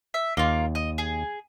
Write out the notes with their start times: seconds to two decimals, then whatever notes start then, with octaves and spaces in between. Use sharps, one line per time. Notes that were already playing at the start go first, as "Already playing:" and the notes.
0.14 E5
0.37 D#2 A#3 F4
0.75 D#5
0.98 G#4